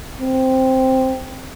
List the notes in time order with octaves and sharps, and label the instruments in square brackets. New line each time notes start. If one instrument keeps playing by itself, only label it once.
[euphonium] C4